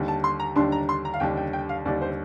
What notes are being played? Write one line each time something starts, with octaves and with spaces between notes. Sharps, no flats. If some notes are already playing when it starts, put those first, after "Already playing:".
Already playing: D#2 D3 G3 D4
A5
C6
A#5
D#2 D3 G3 D4 C6
A#5
C6
A#5
F5
D#2 D3 G3 D4 G5
G5
G5
F5
D#2 D3 G3 D4 D5
C5